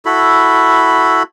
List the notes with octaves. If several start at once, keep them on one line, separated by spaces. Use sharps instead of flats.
E4 F#4 A4 B5